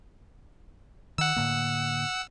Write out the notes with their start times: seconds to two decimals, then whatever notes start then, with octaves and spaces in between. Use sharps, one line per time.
1.18 D#3 F#5 E6
1.36 A2 D3 A#3